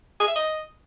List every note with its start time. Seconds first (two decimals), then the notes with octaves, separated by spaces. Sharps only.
0.20 G#4
0.28 E5
0.36 D#5